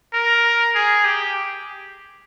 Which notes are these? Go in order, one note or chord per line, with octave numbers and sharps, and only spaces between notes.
A#4
G#4
G4